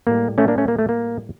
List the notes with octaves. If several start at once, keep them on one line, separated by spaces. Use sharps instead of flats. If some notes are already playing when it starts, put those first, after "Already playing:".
A2 G3 A#3
A3 C#4
A#3 D4
A3 C#4
A#3
A3
A#3